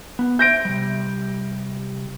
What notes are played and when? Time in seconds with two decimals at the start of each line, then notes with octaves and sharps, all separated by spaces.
0.19 B3
0.39 E5 G6 A#6 D7
0.65 C3 G3